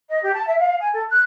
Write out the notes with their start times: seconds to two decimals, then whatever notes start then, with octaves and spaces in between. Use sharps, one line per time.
0.08 D#5
0.22 G4
0.34 A5
0.46 E5
0.59 F5
0.78 G#5
0.92 A4
1.08 F#6